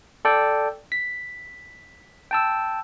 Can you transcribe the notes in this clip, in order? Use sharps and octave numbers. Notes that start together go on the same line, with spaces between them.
A4 D5 G5
B6
G5 A5 E6